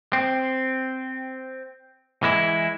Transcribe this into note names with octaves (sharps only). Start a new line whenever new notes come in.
C4
E3 G#3 E4